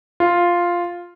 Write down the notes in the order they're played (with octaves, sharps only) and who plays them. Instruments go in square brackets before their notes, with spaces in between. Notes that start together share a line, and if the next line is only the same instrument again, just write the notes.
[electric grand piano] F4